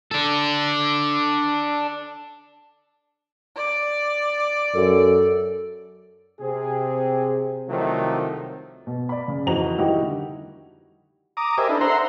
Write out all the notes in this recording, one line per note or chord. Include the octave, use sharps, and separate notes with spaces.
D4 A4
D5
F#2 A4
C3 C4 G#4
C2 C3 D#3 F3 F#3 A3
B2
D5 B5
C#3
F2 E3 D#4 F#4 A#5 F7
D#3 G3 D#4 E4 F#4 G4
D3
A#5 D6 D#6
G4 A#4 C5 D#5 E5 G#5
D4 D#4 A4 B4
C5 E5 F#5 A#5 C6